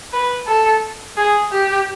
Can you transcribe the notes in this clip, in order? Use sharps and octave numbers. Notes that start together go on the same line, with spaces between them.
B4
A4
G#4
G4